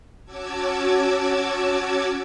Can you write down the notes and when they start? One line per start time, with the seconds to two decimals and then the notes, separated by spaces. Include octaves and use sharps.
0.25 C#4 F#4 A5 D6 E6 G#6